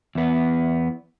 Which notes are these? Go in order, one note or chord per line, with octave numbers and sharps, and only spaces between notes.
E2 B3